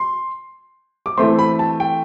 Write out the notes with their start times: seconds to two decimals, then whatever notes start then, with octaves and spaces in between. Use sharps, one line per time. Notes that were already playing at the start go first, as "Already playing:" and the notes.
Already playing: C6
1.06 D6
1.18 E3 A3 C4 C6
1.39 B5
1.59 A5
1.80 G5